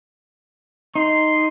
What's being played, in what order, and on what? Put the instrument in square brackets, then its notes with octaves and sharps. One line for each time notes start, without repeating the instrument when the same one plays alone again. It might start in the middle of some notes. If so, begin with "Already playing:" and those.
[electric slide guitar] D#4 [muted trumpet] C6